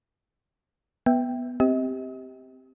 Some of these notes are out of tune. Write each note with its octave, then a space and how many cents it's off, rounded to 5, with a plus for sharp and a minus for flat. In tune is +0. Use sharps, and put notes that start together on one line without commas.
B3 +0 E5 +0 G5 -5
C4 -10 G4 +0 D#5 +40